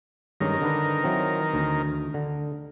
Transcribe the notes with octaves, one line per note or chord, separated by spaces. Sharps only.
G2 D#3 G#3 C#4 A#4
D3 D4 B4
E3 F#3 C4
D2
D3